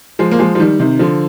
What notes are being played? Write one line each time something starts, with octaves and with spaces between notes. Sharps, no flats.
F3 G#3
A#3
F3 G#3
F3
D#3 G3
C3 D#3
D3 F3